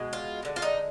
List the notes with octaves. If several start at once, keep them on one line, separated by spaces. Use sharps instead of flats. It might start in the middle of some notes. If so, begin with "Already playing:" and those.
Already playing: B2 G#3
F4
D3 G#3
F4
D#4